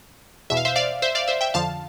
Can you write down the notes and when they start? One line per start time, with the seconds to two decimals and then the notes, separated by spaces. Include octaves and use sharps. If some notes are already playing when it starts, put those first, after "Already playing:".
0.50 E2 B2 E5
0.57 F5
0.65 C5 E5
0.76 D5 F5
1.02 C5 E5
1.15 D5 F5
1.28 C5 E5
1.41 E5 G5
1.54 F2 D3 F3 F5 A5